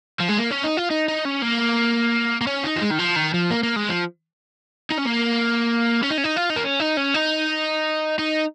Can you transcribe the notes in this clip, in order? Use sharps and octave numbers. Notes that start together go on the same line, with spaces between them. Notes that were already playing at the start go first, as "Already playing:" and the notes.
F3
G#3
A#3
C#4
D#4
F4
D#4
D#4
C#4
A#3
A#3
C#4
D#4
F3
G#3
D#3
F3
D#3
F3
A#3
A#3
G#3
F3
D#4
C#4
A#3
C#4
D#4
C#4
D#4
F4
D#4
A#3
C#4
D#4
C#4
D#4
D#4